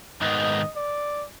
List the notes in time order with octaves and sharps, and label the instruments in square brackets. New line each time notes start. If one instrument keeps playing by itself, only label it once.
[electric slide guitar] G#2 D#3 G#3 B3 D#4 [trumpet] D#5
[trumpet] D5